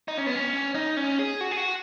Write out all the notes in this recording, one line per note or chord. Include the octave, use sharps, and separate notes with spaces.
D#4
C#4
B3
C#4
D#4
C#4
G#4
F#4
G#4
F#4